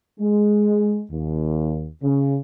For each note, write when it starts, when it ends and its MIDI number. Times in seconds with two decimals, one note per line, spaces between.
0.19 1.01 56
1.11 1.89 39
2.02 2.37 49